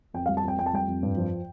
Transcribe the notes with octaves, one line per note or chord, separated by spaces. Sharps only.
F2 G5
G3 F5
A5
F2 G5
F2 G5
A5
G3 G5
F2
G2
F3